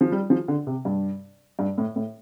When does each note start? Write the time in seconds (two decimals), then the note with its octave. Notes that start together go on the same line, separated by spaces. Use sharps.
0.01 F3
0.12 G3
0.30 F3
0.48 D3
0.67 C3
0.85 G2
1.59 G2
1.78 A2
1.96 A2